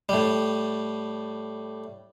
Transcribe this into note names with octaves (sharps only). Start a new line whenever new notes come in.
A2 G3